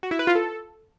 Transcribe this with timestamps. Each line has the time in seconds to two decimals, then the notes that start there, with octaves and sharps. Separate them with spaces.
0.03 F#4
0.11 E4
0.19 B4
0.27 F4
0.35 A4